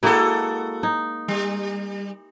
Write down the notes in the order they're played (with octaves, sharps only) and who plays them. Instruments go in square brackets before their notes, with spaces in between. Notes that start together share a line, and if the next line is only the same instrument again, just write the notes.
[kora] G#3 A#3 E4 [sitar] F#4 A4
[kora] D#4
[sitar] G3